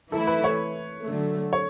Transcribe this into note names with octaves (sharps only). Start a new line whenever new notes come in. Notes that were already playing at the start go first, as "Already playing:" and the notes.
E3 A3 E4 A4
B4
C#5
D3 F#3 A3
C#5